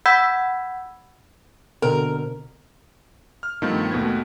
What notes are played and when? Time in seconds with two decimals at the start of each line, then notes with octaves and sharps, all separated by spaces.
0.06 F#5 B5 E6 G6 G#6 B6
1.82 B2 D3 C4 A#4
3.43 F6
3.62 G2 D#3 F3 A3 B3 C4
3.91 D#2 B2 A3 B4 G#6